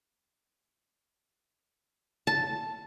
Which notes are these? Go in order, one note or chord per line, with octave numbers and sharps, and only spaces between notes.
A5